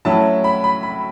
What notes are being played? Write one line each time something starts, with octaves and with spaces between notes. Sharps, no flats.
A2 F#3 C#4 E4 A5
B5
B5
B5